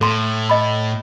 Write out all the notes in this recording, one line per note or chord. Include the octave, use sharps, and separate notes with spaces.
A2 A4 C6
D#5 B5